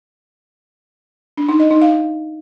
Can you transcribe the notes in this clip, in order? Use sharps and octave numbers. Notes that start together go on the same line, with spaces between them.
D4
D#4
D#5
D#4
F5